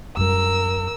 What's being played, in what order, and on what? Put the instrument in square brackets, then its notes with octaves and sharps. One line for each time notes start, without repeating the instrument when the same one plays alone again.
[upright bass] F#2 G3 [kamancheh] A#4 E6